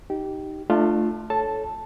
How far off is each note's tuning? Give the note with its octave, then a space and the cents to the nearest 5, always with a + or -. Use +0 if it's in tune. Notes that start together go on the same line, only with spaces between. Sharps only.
D#4 +0 G4 -20
A3 +0 D4 +35 F4 +0
A4 -15 C#5 +0 A5 +0